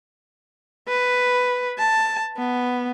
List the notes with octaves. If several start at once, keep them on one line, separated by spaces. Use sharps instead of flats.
B4
A5
B3